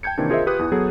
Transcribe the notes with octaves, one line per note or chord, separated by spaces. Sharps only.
G5 A5 G6 G#6 C#7
C3 D#3 E3 A#3 C4 D4
F4 G#4 A#4 C5 D#5 E5
F4 G4 B4 D#6 F#6
E2 E3
F#3 B3 G#4 A4